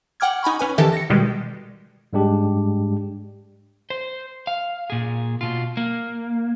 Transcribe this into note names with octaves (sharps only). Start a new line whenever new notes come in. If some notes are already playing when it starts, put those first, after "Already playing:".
F#5 G5 D6 F6 G#6
D#4 G#5 B5 C#6
C#4 B4 G#5
D#3 E3 G4 A4 E5 A5
A#6 C#7
B2 D#3 G3 G#3
G#2 G3 G#3 D4 G4
C5
F5
A#2 G#4
B2 F4
A#3